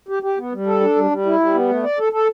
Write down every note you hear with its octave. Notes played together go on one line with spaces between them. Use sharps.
G4
G4
B3
G3
A4
D4
G3
G3
E4
G3
B3
A3
D5
A4
A4